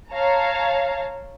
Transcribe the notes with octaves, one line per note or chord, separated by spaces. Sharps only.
C#5 F5 A5 A#5